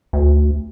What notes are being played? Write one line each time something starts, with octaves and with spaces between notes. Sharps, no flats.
D2